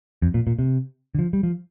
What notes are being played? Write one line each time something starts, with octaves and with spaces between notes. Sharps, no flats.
F2
A#2
A#2
C3
D3
F3
G3
F3